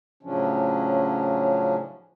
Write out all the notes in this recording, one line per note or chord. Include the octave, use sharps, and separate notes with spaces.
A2 C#3 F3 F#3 C#4 D4